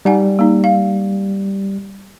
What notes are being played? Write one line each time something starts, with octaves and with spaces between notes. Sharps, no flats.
G3 D#4 F#5 G#5
A#3 D#4
F5